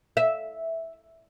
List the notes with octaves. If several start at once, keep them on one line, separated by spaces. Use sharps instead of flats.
E5